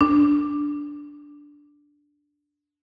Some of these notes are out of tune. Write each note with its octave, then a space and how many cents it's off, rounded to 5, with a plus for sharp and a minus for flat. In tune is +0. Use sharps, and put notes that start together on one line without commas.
D4 -5